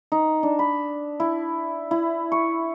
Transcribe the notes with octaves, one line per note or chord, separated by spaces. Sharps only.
D#4
D4
B5
E4
E4
C#6